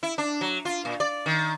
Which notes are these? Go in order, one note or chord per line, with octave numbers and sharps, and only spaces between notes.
E4
D4
F#3
F4
A#2
D5
D#3